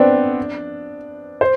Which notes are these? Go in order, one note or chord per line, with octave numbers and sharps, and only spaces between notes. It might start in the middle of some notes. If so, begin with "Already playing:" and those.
Already playing: B3 C4 D4
C5